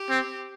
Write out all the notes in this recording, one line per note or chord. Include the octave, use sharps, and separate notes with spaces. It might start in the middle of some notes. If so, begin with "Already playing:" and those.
Already playing: G4
C4